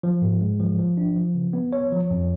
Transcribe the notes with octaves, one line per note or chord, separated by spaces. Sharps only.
F3
G#2
G#3
F3
F3
D4
F3
C#3
B3
C#5
F3
F2